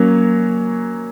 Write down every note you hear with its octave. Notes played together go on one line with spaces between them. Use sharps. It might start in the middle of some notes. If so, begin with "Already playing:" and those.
Already playing: F#3 A#3 C#4